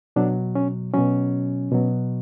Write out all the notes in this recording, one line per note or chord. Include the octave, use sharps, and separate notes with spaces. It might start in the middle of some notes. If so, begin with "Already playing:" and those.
B2 F#3 D4
C#4
B2 F#3 C#4
B2 F#3